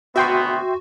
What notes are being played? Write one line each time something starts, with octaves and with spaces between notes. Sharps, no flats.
G#1 D2 B3 F#4 E5 G5 C6